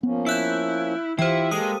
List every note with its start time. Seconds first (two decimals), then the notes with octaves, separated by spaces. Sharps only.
0.03 F3 A#3 B3 C#4
0.27 E4 E6 F#6 G6
1.19 E3 E4 F4 G4 C5 E5 G5
1.51 G#3 A#3 G4 A4 D#6 D#7